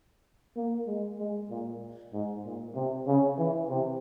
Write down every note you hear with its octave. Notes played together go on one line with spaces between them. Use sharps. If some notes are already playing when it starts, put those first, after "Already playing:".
A#3
G#3
G#3
A#2
G#2
A#2
C3
C#3
E3
C3